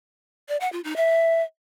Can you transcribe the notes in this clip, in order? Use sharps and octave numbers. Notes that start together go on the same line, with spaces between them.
D5
F#5
F4
D#4
E5